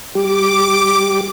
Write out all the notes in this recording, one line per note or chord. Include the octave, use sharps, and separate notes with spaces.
G3 G4 D6